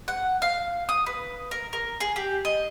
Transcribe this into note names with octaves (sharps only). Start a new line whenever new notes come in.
F#5
F5
D#6
B4
A#4
A#4
G#4
G4
D#5